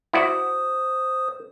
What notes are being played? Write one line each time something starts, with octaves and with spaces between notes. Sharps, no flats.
E4 F#4 C5 D5 D#6